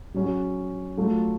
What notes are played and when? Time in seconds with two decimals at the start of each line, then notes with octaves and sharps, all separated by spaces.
0.14 F#3 C#4 F#4
0.97 F#3 A3 F4